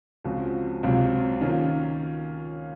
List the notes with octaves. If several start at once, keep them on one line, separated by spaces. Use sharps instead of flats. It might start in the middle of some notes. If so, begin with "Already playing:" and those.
C#2 C#3 F3 C4 F#4
C#2 C3 F#3 C4 F4
D#3 A#3 C#4 F4